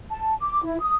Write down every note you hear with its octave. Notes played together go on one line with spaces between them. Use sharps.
A5
D6
E4
D#6